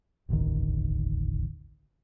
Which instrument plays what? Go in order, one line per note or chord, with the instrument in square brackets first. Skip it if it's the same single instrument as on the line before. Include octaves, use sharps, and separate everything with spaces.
[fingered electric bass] E1 A1 D2 D#3